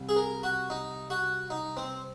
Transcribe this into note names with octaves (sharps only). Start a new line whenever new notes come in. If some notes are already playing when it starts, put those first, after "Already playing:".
Already playing: C2
G#4
A#4
F#4
D#4
F#4
D#4
C4